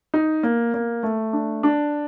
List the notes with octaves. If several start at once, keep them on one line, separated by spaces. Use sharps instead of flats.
D#4
A#3
A#3
A3
D4
D4